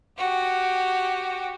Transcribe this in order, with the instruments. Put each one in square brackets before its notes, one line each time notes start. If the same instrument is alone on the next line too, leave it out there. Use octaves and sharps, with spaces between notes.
[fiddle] F#4 G4